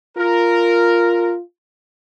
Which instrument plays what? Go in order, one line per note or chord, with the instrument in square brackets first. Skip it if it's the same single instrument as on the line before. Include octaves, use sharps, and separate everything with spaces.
[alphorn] F4 [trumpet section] A#4